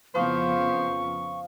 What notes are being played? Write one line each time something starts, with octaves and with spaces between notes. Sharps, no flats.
F2 C#3 F3 B3 C5 C#6